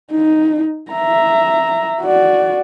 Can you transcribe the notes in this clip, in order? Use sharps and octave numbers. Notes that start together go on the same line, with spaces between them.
D#4
E5 A#5
F#4 D5